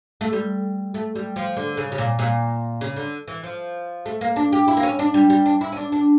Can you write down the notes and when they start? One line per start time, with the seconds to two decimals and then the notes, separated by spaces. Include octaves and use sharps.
0.21 A3
0.33 G3
0.94 A3
1.15 G3
1.36 F3
1.57 D3
1.77 C#3
1.92 C#3
1.98 A#2
2.19 A#2
2.81 C#3
2.96 D3
3.28 E3
3.44 F3
4.06 A3
4.21 A#3
4.36 D4
4.53 G4
4.68 E4
4.77 A#3
4.83 C#4
4.99 D4
5.14 G3
5.30 G3
5.46 D4
5.61 E4
5.72 C#4
5.77 D4
5.92 D4